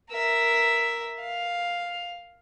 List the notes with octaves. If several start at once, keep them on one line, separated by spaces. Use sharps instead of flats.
A#4 E5
F5